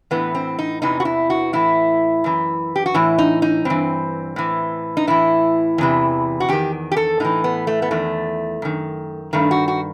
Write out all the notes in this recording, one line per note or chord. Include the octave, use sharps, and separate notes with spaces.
A2 E3 B3
C4
D#4
E2 C3 E3 D#4
F#4
E4
F#4
A2 E3 E4
F#2 E3
G4
F#4
A2 E3 E4
D#4
D#4
G2 E3 C4
A2 E3
D#4
A2 E3 E4
E2 C3 E3
F#4
E2 D#3 G4
G4
A4
A2 E3 D#4
B3
A3
B3
E2 D#3 A3
F#2 D#3
G2 D#3 A3
F#4
F#4